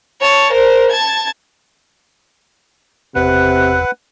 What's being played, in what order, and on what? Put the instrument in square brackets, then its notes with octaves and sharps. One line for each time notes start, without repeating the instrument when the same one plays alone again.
[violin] C#5 A5
A#4 C5
A5 G#6
[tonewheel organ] F#1 E2 [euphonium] C3 [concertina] B4 F#5